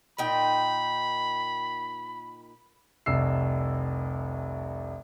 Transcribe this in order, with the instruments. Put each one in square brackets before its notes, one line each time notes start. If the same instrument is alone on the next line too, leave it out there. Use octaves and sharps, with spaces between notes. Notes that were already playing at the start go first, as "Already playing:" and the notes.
[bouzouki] A#2 D#4 G5 [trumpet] B5
[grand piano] F1 C2 E6 C7